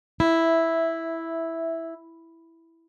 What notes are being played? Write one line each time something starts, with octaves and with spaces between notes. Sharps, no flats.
E4 E5